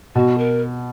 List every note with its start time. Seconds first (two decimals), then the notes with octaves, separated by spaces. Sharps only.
0.15 B2 F#4
0.38 A#4